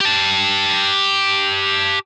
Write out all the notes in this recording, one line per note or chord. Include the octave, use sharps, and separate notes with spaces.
G4 A5